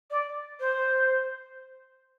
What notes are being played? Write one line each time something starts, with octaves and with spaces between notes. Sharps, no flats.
D5
C5